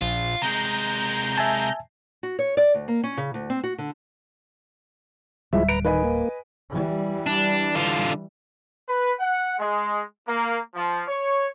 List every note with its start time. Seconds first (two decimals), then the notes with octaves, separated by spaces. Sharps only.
0.01 A#1 F4
0.42 C3 G#3 A#5 G6
1.38 E5 G#5 A5
2.23 F#4
2.39 C#5
2.57 D5
2.74 D2
2.88 A#3
3.04 C#4
3.17 C#3
3.34 D2
3.50 C4
3.63 F#4
3.78 D3
5.53 D1 F3 G3 G#3 E4 E5
5.69 B4 A#5 D7
5.85 D#3 B4 D#5 G#5
6.04 A#3
6.71 E3 G3
7.27 D4
7.75 D3 F4
8.88 B4
9.20 F#5
9.60 G#3
10.28 A#3
10.75 F3
11.08 C#5